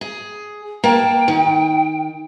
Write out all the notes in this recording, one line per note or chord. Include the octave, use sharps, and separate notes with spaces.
G#4
A#3 G5 A5
D#3